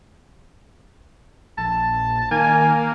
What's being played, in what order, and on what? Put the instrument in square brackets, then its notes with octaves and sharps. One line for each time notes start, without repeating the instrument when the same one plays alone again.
[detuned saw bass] A#1 [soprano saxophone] A5
[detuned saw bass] D#3 [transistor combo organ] A#3 [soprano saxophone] G#5